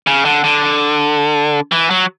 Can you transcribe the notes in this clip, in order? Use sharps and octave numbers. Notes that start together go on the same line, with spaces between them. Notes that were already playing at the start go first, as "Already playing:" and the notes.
C#3
D3
D3
E3
F#3